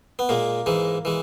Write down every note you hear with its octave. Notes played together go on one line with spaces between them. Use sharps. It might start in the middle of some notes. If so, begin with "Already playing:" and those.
B3
A#2 G#3 A#3
G#2 E3 G#3
E3 G#3